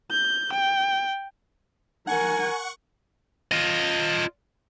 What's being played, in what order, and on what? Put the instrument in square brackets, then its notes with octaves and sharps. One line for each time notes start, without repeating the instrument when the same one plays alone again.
[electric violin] G6
G5
[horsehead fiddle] A#4 G#5 [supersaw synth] F#5 C#6
[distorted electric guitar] F4 D#5